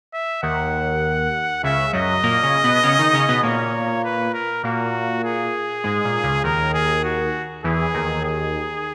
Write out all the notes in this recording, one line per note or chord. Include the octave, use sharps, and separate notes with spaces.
E5
D#2 D#3 F#5
C#2 C#3 E5
F#2 F#3 D#5
A#2 A#3
C#3 C#4
B2 B3
C#3 C#4
D#3 D#4
C#3 C#4
B2 B3
A#2 A#3 C#5
B4
A#4
A#2 A#3 F#4
G#4
G#2 G#3
A#2
C#2 C#3
D#2 D#3 A#4
G#4
F#4
E2 E3 G#4
D#2 D#3
G#4